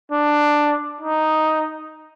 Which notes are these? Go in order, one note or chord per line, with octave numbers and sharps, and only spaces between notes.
D4
D#4